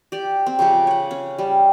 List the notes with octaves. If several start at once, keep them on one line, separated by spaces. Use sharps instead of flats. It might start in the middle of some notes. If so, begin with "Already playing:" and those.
G4 D5
C4
C#3 F3 G4 C#5
C#5 F#5
C#4
G3